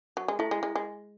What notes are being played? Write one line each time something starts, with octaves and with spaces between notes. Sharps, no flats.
F#3
G#3
A3 E4
G#3
G#3
G#3